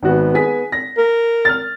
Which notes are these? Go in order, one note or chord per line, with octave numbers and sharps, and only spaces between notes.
G#1 B3 F#4
G#4 G#5 B6
A#6
A#4
F6 A6